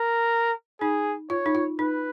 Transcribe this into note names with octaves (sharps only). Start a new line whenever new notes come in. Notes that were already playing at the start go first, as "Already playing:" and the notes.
Already playing: A#4
D#4 G#4
F4 C#5
D#4
F4
D#4 B4